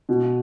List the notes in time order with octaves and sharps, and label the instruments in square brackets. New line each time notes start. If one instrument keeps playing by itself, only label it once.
[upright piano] B2